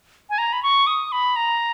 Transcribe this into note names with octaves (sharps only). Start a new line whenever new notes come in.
G#5
A#5
B5
C#6
D#6
B5
A#5